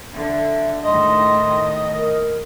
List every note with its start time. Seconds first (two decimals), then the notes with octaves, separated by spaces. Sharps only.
0.15 D3 E5
0.84 A2 D#3 D#5 C6
1.94 A#4